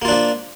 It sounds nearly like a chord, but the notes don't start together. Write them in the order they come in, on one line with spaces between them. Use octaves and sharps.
A#3 F4 D4 F3